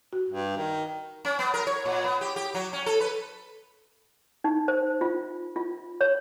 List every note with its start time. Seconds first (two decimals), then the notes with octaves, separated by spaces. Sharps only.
0.13 F#4
0.29 G2
0.57 D#3
1.25 C#4
1.39 B3
1.54 A#4
1.67 C#5
1.85 A#2
2.04 B3
2.21 G4
2.36 G4
2.54 F#3
2.73 C#4
2.86 A4
3.00 B4
4.44 D#4
4.68 C5
5.01 F4
5.56 F4
6.01 C#5